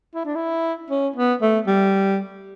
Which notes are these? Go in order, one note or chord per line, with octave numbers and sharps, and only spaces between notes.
E4
D4
E4
C#4
B3
A3
G3